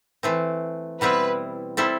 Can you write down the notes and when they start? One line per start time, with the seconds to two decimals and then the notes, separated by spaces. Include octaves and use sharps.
0.23 E3 A3 C4
1.00 B2 G3 C4 E4 B4
1.77 G3 C4 E4 A4